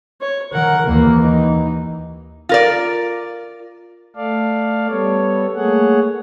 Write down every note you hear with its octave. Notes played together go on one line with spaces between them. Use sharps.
C#5
D#3 A#4 F#5
D#2 E3 A#3
D#4
F4 A#4 D5
A3 A4 D5 F5
G3 B3 A4 C#5
A3 A#3 G#4 C#5 F#5